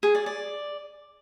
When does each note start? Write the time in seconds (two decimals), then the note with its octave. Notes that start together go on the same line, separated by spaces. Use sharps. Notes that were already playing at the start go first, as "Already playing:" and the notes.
0.03 G#4
0.15 D5
0.26 D5